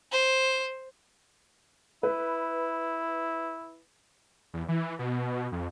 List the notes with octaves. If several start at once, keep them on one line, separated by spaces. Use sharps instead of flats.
C5
E4 B4
E2
E3
B2
F2